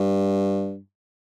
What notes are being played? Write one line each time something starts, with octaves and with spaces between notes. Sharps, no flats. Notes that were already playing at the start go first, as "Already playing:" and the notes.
Already playing: G2